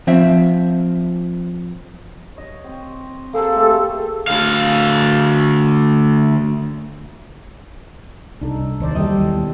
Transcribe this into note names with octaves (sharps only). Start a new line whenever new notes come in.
F3 C4 E5
C#5 D#5
C4
A#3 G#4 A4 C5
A3 G4
D2 F5
C2 D4 D#4 A4
D#2 F#3 C5 D5
E3 G3 A4 D#5
D#2 B2